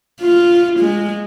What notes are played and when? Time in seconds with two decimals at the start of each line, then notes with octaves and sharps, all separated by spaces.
0.21 F4
0.80 G#3